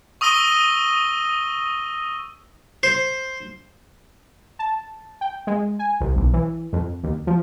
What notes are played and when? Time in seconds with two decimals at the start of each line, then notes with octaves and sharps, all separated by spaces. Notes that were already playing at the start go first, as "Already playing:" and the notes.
0.21 C#6 D#6 E6 A#6 D#7 G7
2.83 C5
4.59 A5
5.21 G5
5.47 G#3
5.79 G#5
6.01 C2
6.16 B1
6.33 E3
6.73 F2
7.03 D#2
7.27 F3